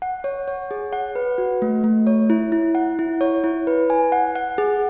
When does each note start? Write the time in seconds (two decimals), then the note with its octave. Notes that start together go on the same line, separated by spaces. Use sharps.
0.02 F#5
0.24 C#5
0.48 C#5
0.71 G#4
0.93 F#5
1.15 B4
1.38 F#4
1.62 A3
1.84 A3
2.07 C#5
2.30 E4
2.52 E4
2.75 F#5
2.99 E4
3.21 C#5
3.44 E4
3.67 B4
3.90 G#5
4.12 F#5
4.35 F#5
4.58 G#4